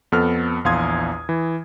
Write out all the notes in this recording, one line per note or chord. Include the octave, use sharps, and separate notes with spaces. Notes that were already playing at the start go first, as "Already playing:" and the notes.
F2 B3 A4 F6
A#1 E2 F5 C6 D#6 G#6
E3